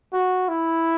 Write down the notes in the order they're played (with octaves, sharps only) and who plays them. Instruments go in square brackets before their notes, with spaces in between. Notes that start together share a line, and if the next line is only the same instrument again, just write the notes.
[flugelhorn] F#4
E4